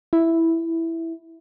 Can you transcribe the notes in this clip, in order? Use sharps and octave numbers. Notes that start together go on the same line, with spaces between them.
E4